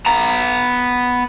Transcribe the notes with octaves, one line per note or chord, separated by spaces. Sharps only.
B3 A#5